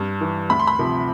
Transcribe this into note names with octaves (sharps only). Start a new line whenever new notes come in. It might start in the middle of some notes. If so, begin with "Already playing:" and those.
Already playing: G2
E3
D2 B5
C6
B5
C3 F3